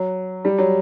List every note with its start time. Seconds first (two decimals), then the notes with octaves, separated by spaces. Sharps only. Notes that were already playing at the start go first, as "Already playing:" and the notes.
Already playing: F#3
0.45 G3
0.58 F#3